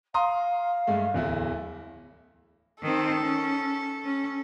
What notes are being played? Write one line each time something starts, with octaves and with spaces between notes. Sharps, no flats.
F5 A#5 C6 D#6
G2 G#3 A3
D1 E2 E4
D#3 C4 A4
C#4
C#4